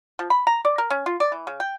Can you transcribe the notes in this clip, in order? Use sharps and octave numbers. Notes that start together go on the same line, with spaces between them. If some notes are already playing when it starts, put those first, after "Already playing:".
F3
B5
A#5
D5
A#4
C#4
F4
D5
E3
C#3
G5